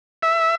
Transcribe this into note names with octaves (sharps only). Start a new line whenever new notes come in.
E5